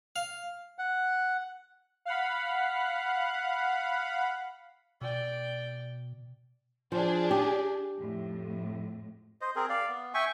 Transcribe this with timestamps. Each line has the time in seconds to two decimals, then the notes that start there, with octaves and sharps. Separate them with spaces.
0.16 F5
0.79 F#5
2.05 F5 F#5 B5
5.01 B2 D5 G5
6.92 F3 D4 G#4
7.31 G4
7.98 F2 A2
9.41 C5 D#5
9.56 C4 G#4 A#4
9.69 D5 F5
9.88 B3
10.14 E5 G5 G#5 C#6